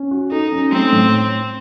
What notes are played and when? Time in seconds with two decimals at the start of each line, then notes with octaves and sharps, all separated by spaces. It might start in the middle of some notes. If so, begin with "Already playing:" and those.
Already playing: C#4
0.11 F#4
0.31 D#4 A4
0.52 C#4
0.72 A3 C4
0.92 A2